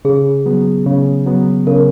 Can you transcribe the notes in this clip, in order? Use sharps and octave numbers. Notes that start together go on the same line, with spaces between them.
C#3 G#4
F#3 B3
C#3
F#3 B3
C#3 A#4